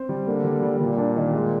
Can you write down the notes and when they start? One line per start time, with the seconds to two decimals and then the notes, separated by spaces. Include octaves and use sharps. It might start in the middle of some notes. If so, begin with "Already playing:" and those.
Already playing: C4 C5
0.09 G3
0.27 D3 A#3
0.44 G3
0.63 G3
0.80 A#2 G3
0.97 D4
1.16 D#3
1.34 G#3